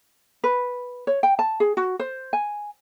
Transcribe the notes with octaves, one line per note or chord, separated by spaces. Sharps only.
B4
C#5
G5
A5
G#4
F#4
C5
G#5